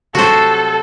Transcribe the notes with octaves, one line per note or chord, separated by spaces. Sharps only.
C3 F#3 F#4 A4 C5 F#5